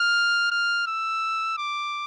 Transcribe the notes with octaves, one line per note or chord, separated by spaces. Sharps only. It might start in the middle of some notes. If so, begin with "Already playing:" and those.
Already playing: F6
F6
E6
D6